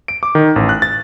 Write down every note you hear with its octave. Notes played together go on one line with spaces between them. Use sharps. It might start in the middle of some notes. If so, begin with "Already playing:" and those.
D7
D6
D#3
A1
F#6
A6